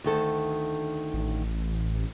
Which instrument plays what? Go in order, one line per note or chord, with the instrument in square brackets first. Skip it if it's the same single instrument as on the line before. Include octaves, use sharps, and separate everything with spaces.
[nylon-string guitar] D2 D#3 A4
[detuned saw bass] A1